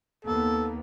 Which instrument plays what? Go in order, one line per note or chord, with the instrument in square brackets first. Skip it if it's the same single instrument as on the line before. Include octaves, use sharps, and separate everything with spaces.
[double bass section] D#2 A#3 B3 [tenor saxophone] A4